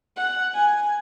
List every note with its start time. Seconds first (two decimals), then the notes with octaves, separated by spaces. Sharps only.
0.16 F#5
0.54 G#5